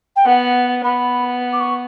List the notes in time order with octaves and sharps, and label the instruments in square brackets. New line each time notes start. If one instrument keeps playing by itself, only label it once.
[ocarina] G5
[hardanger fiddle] B3 [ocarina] F#5
[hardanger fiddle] B3 [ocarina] B5
[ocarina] D6
C#6